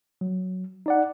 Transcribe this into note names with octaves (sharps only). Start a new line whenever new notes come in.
F#3
D#4 D5 F#5